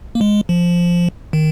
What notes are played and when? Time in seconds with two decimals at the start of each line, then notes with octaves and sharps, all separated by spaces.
0.15 A#3
0.21 G#3
0.49 F3
1.33 D#3